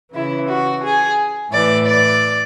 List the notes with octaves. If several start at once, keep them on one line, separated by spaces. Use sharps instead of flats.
C#3 E3 E4
F#4
G#4
A2 E3 D5
D5